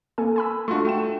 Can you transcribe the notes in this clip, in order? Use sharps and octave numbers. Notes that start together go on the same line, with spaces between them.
A#3 A4 G#5
G#5 B5 E6
A3 D4 F4 F#4 C6
A3 G5 E7